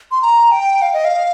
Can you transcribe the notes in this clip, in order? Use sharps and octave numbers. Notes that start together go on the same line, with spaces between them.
C6
A#5
G5
F5
D#5
F5